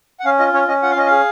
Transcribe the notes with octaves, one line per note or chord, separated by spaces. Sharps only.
F#5
C#4 F5
F4 D#5
C#4 C#5
C#4 D#5
F4 F#5
F5
C#4 D#5
G#4 F5